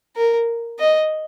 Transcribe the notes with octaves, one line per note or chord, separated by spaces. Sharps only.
A#4
D#5